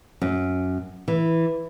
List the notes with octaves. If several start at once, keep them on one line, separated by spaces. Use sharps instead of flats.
F#2
E3